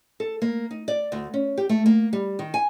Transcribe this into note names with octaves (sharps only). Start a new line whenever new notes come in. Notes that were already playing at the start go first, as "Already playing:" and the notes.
A4
A#3
D#4
D5
D2
C#4
G4
A3
A#3
G3
D#3
G#5